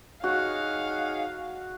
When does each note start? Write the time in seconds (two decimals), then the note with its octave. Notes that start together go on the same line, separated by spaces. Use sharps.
0.24 D#4 F#4 G#4 C#5 F5